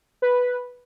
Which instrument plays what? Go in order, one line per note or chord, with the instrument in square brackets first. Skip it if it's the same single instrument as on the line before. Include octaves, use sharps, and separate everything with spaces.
[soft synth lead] B4